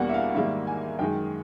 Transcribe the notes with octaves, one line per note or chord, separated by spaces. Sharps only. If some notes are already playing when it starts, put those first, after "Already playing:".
Already playing: E2 B2 G3 A#3 F#5
E5
F5
G#2 D#3 G3 A#3 E5
G#5
F#2 D#3 G#3 G5